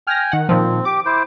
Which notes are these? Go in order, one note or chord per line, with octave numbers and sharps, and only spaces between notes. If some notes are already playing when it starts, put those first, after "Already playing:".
G5 G#5 F6 A#6
D#3 F#5
A#2 D#3 F3 C4
G4 D6
E4 C5